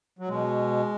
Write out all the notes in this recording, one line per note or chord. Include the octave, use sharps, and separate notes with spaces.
F#3
B2 G#3